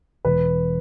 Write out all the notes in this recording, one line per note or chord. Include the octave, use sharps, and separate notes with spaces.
E1 B4